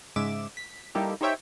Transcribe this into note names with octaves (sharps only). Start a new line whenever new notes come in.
G#2 C#3 G#3 E5 D6 E7
B6
G3 A#3 D#4 E4 G4 A4
D#4 G4 C5 C#5 E5 G5